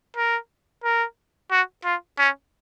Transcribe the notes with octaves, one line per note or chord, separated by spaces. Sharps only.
A#4
A#4
F#4
F4
C#4